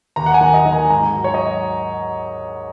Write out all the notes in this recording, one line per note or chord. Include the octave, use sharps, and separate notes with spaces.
D#2 A#5
F#5
G#5
D#3
D#5
D#3
G#5
G#2 A#5
F#3
C#5
D#5